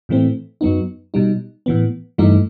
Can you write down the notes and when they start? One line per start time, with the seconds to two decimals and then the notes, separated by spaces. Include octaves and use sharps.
0.09 A2 E3 A3 C4
0.61 F#2 F#3 B3 D#4
1.14 B2 G3 D#4
1.66 A2 E3 B3
2.18 G2 E3 A3 D#4